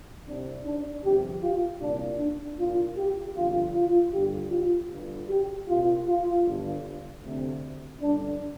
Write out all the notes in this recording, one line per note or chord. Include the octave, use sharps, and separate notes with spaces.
C2 C3 D4
D4
G1 F2 C3 G4
F4
C2 A#2 D4
D4
C2 A#2 F4
G4
G1 F2 D3 F4
F4
G1 G2 D3 G4
F4
G1 G2 D3
G4
C2 A#2 F4
F4
G1 G2 D3
D2 C3
G1 G2 D3 D4